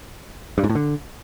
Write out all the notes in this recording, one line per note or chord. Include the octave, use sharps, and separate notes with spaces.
G2
G#2
A2
D3